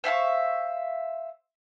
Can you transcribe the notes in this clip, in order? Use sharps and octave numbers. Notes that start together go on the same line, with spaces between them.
C5 E5 F5 C#6